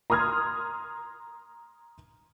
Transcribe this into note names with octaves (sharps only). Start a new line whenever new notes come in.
A#5 C6 D#6 F6 G#6